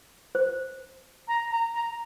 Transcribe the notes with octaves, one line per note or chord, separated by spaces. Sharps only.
C5
A#5
A#5
A#5